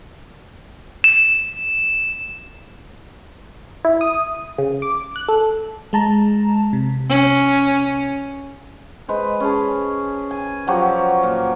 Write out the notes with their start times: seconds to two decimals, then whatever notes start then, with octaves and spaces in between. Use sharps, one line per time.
1.04 E7
3.85 E4
4.01 D#6
4.58 C#3
4.82 D6
5.16 F#6
5.28 A4
5.93 G#3 A5 A#5
6.73 C3
7.09 C#4
9.08 G#3 B4 C5
9.40 C#4 G#4 A5
10.31 G#5
10.67 F3 F#3 F#4 G4
11.23 A#2